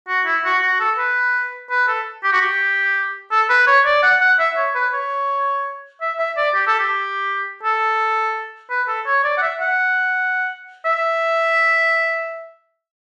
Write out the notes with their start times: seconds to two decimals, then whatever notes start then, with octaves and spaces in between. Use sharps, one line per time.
0.08 F#4
0.26 E4
0.44 F#4
0.62 F#4
0.80 A4
0.98 B4
1.70 B4
1.87 A4
2.24 G4
2.32 F#4
2.41 G4
3.31 A4
3.49 B4
3.67 C#5
3.85 D5
4.03 F#5
4.21 F#5
4.39 E5
4.57 C#5
4.75 B4
4.93 C#5
6.01 E5
6.19 E5
6.37 D5
6.55 G4
6.67 A4
6.79 G4
7.63 A4
8.70 B4
8.88 A4
9.06 C#5
9.24 D5
9.37 F#5
9.42 E5
9.60 F#5
10.85 E5